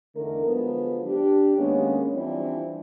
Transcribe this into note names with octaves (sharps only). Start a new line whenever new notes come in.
E2 D3 A3 D#4 A#4
D3 F3 F#3 G#3 B3
D4 G4
D#2 G#3 A#3 B3 C#4
E3 F3 G3 C4 D4 E4